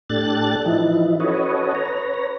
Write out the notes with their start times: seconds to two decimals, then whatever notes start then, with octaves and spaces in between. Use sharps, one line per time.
0.10 A2 D4 G4 A4 F#6 A6
0.66 E3 F3 D#4 E4
1.20 C#4 F#4 A4 B4 C#5 D#5
1.75 B4 C#5 A#5